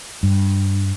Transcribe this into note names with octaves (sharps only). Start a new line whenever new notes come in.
G2